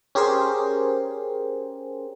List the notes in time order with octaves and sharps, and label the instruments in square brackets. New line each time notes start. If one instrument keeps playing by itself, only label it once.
[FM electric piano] C#4 G4 G#4 A#4 C5